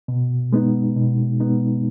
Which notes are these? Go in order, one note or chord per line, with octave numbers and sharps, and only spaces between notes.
B2
G#3 B3 D#4
B2
G#3 B3 D#4